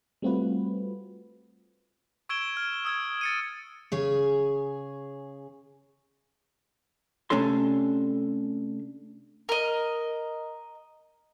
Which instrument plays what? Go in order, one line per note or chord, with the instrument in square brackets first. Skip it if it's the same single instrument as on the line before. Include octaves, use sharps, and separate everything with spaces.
[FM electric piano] G3 A3 C4 F4 F#4 B4
[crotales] C#6 E6 G#6 D7 E7 G7
F6
D#6 E6 G#6
A6 C#7 D#7
[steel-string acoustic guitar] C#3 G#4 C#5
[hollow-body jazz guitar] C3 A3 C#4 D4 A4 C6
[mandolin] A#4 D#5